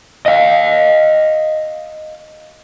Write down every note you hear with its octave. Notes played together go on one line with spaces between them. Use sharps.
D#5 F5